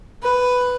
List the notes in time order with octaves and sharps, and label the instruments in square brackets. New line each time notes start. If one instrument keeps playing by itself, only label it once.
[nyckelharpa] B4